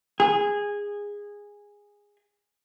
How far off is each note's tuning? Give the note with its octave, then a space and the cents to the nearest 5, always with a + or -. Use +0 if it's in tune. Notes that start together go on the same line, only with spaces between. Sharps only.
G#4 -15